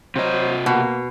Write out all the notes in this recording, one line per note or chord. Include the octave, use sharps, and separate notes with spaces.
C3 F#3 C5 D#5
B2 A#3